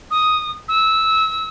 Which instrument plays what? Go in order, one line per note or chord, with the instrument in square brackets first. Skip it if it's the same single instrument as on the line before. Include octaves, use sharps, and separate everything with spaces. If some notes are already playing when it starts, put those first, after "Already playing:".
[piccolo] D#6
E6